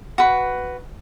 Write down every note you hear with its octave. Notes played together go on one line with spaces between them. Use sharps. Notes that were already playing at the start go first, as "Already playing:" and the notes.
F#4 B4